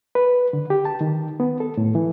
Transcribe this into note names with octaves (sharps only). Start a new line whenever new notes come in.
B4
D3
G4
A5
D#3
B3
A4
A2
E3